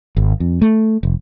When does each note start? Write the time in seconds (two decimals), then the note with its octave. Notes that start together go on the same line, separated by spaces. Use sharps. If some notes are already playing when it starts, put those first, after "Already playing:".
0.17 G#1
0.40 F2
0.62 A3
1.03 F1